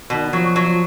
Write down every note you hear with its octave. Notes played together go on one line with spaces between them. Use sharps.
B2 D#3
F3 F#3
F#3